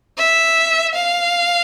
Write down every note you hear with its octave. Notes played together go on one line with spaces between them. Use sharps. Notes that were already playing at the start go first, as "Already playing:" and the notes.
E5
F5